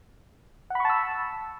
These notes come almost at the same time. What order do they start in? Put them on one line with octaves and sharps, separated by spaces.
F#5 B5 C#6 A5 E6